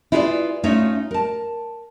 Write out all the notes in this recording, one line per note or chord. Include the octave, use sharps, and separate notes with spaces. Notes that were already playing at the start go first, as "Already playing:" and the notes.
E4 F4 G#4 B4 C5 D5
A3 C#4 D#4 F4 C#5 E5
A#4 A5